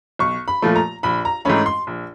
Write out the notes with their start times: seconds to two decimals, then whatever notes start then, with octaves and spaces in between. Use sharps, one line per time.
0.19 B1 C#6
0.48 B5
0.62 A#2 F3 A3
0.76 A#5
1.03 A#1 B5
1.25 A#5
1.45 G#2 E3 A3 C#4 B5
1.66 C6
1.87 A#1